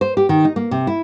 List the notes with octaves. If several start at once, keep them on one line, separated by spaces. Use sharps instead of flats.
C5
G4
D#3
D#4
A#3
C3
E4